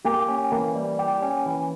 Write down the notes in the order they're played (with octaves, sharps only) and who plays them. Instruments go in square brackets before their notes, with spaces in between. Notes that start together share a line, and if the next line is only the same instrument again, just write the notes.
[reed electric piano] A#3 [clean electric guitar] G4
[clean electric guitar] C#4
[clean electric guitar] E3 [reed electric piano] A#3
[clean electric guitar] G3
G4
C#4
E3